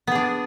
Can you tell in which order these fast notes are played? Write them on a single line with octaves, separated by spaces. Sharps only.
B3 G#4 D4